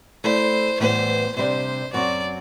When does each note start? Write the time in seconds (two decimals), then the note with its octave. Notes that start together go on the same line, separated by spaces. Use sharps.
0.24 A3 E4 A4 C5 D5
0.80 A2 E3 G3 B3 C5
1.36 C3 G3 D4 C5
1.93 F#2 F#3 C4 D5